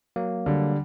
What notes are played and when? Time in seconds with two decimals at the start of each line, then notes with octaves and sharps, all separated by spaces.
0.16 F#3 A#3 F5
0.46 D3 G3